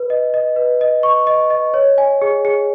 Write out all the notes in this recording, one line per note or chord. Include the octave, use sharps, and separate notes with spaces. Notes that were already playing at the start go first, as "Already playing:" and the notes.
Already playing: B4
D#5
D#5
B4
D#5
C#6
D#5
D#5
C#5
G#5
G#4
G#4